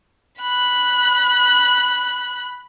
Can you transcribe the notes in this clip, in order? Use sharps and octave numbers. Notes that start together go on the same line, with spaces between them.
B5 F#6